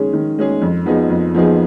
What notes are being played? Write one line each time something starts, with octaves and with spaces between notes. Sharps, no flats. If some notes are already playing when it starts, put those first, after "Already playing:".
Already playing: D#3 G#3 C#4 G#4
D#3
G#3 C#4 G#4
F2
F3 B3 D#4 G#4
F2
F3 B3 D#4 G#4